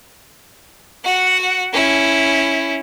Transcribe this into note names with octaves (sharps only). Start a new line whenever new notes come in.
F#4 F#5
C#4 E4